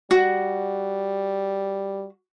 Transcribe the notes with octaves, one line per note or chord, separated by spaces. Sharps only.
G3 F#4